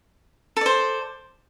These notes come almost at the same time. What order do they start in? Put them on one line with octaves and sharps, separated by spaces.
A4 D5 C5